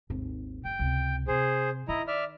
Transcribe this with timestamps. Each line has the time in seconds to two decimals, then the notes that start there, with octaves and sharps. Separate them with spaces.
0.10 G#1 D#2
0.65 F#1 G5
0.79 C#2 C3
1.28 C3 G#4 C5
1.88 D#3 E4 D#5 A#5
2.08 D5 E5 F6